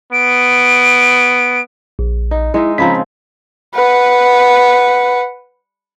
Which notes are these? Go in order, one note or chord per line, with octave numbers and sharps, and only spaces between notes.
B3 D7
A#1
D#4
G#3 D#4 E4 E5
C#3 F3 C4 A#5 B5 B6
B4 F#5